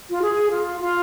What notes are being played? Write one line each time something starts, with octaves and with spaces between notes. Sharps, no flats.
F4
G#4
F4
F4